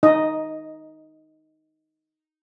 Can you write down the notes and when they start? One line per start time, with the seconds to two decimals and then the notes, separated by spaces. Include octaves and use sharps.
0.03 D#4 D#5